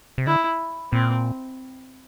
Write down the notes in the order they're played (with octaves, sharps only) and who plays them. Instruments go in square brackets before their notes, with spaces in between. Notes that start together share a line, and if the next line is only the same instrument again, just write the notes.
[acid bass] C3
[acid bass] D3 [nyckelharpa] E4
[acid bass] A#2 [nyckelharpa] C4